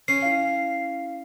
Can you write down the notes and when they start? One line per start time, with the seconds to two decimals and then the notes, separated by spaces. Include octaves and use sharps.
0.08 C#4 C7
0.22 E4 F5